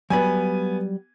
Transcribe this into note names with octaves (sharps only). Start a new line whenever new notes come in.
F#3 G3 B3 G#5 B5